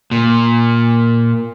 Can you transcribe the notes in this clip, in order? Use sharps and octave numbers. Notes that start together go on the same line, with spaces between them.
A#2